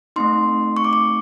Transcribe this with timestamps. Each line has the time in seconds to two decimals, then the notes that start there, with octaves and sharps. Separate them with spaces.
0.16 A3 C4 D#4 C6
0.77 C#6
0.84 D6
0.93 C#6